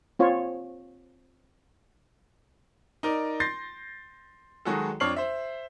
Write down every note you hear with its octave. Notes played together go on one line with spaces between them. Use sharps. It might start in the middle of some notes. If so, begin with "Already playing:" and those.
C4 F4 C#5
D#4 A#4 D5
C6 G6 A6 A#6 C7
D#3 F#3 G#3 F#4 G#4 A4
F2 D4 C#5 F6 C7 F#7
C5 E5